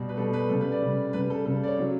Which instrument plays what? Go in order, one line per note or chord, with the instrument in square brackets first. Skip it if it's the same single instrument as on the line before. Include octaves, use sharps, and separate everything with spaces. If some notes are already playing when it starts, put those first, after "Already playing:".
Already playing: [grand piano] B2 G3
B4
B2 G3 A4
B4
C#3 G3 A4
B4
D5
C#3 G3
C#3 G3 B4
A4
C#3 G3 A4
D5
C#5
C#3 F#3